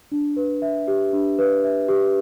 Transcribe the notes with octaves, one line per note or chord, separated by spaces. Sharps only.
D4
B4
E5
G4
D4
B4
E5
G4